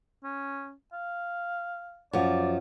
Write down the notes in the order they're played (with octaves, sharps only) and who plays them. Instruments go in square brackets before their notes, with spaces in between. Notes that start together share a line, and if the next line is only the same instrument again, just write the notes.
[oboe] C#4
F5
[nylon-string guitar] F#2 F3 [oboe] D5